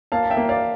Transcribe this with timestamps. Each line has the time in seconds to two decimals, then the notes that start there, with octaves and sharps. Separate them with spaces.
0.12 A#3 F5 A5
0.23 A5
0.30 E5 G5
0.37 A#3
0.49 D5 F5